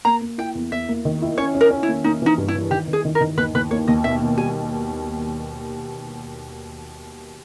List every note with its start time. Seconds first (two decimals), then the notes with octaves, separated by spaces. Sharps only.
0.05 A#3 A#5
0.21 A#3
0.38 E4 G5
0.55 E2
0.72 E2 E5
0.89 A#3
1.05 D#3
1.22 E4
1.38 C#4 C#5
1.54 C#4
1.61 A#4
1.71 C#4
1.83 E4
1.88 A#3
2.04 A#3 D#4
2.22 E3 D#4
2.38 G2
2.48 E4
2.55 E3
2.71 D#3 G4
2.87 D#3
2.93 G#4
3.05 D#3
3.15 A#4
3.21 D#3
3.37 D#2 B4
3.54 D#2 B4
3.71 A#3 C#5
3.88 D#2 D#5
4.04 B2 E5
4.21 B2
4.37 G3 G#5